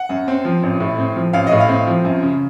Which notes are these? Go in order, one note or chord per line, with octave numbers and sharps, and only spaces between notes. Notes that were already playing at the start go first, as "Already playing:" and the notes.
Already playing: F#5
F#2
C4
F3
A1
A2
C4
F3
A1 F5
A2 D#5
F5
C4
F3
F#2
C#3